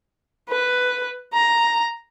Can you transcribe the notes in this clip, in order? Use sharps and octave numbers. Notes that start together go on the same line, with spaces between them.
B4
A#5